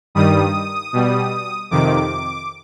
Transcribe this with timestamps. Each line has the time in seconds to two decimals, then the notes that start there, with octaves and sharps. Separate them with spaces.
0.15 G2 D#3 G3 D#6
0.93 B2 G3
1.71 F2 C3 D#3 D6